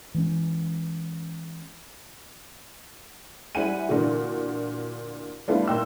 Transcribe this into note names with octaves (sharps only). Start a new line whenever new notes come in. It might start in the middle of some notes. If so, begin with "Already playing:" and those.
E3 G#3 C#4
G3 E4 C5 F#5 G#5 D#7
A#2 D3 E3 F#4
G3 A3 B3 D4 E4 F4
A#2 D#4 G5 E6